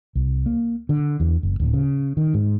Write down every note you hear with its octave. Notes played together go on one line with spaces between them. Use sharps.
C2
A#3
D3
E2
F#1
D1
C#3
D#3
G#2